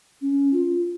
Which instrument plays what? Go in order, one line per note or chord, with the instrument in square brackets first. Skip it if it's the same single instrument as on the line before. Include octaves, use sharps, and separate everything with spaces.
[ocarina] C#4
F4